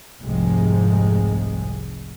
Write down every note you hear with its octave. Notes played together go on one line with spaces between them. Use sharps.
F1 C2 G#2 C3 F3 G#3